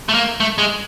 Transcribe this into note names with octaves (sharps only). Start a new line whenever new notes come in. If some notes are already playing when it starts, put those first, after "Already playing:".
A3
A#3
A3
G#3